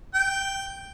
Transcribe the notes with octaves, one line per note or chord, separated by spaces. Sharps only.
G5